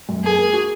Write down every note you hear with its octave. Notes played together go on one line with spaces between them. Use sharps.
F#2
A#3 G#4
A#3
F#4